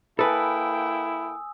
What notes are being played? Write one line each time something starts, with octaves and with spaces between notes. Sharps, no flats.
A#3 E4 A4 B4 G5 G#5 D#6 E6